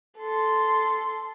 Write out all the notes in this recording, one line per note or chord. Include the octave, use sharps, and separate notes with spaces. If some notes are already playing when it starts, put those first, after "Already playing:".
A4 C6